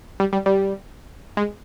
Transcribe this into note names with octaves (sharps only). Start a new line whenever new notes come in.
G3
G3
G3
G#3